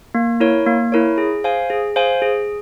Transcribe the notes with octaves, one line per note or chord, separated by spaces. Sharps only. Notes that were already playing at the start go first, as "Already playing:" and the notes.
A#3
E4 A#4 C#5
A#3
E4 A#4 C#5
G#4
C5 F5 G#5
G#4
C5 F5 G#5
G#4